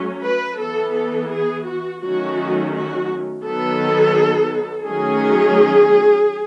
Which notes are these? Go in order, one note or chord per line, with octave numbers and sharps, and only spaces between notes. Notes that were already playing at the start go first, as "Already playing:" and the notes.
Already playing: F#3 A3 C#4
B4
E3 B3 A4
A4
G#4
F#4
D#3 F#3 A3 C#4 F#4
F#4
D#3 F#3 B3 A4
D#3 F#3 A3 C#4 G#4